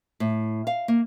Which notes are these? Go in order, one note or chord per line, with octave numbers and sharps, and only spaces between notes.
A2
F5
A#3